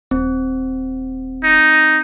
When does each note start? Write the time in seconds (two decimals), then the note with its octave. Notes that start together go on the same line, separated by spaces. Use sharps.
0.11 D#1 C4
1.44 D#4